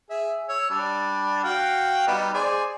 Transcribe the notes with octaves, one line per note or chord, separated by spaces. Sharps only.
G#4 E5
C#5 E6
G3 D4
F#4 F5 G5
G3 B3 D#4
G#4 C5 D5